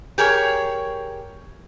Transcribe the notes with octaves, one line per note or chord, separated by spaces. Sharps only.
G4 G#4 A#4 C#5